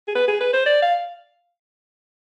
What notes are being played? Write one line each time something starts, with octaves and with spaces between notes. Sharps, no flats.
G#4
B4
G#4
B4
C5
D5
F5